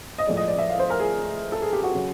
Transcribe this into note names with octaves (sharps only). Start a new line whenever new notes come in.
D#5
A2 F3 G#3 D5
D#5
D5
E5
F5
C5
A#4
G#4
A4
G#4
G4
F#4
C#3 F#3